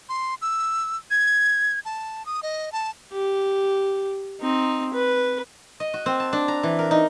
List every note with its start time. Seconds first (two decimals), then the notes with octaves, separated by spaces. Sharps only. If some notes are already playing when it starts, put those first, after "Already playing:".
0.09 C6
0.42 E6
1.11 G#6
1.85 A5
2.26 D#6
2.43 D#5
2.72 A5
3.13 G4
4.41 C4 D#4
4.94 B4
5.80 D#5
5.94 F#4
6.06 C4
6.20 A5
6.33 D4
6.48 A#5
6.63 E3
6.79 A#4
6.91 D#4